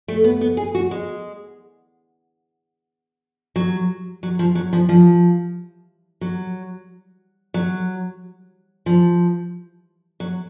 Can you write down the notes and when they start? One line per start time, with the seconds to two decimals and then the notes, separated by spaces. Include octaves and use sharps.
0.08 A3
0.24 B3
0.41 B3
0.57 G#4
0.75 F#4
0.91 G#3
3.56 F#3
4.23 F#3
4.39 F3
4.55 F#3
4.73 F3
4.89 F3
6.21 F#3
7.54 F#3
8.86 F3
10.20 F#3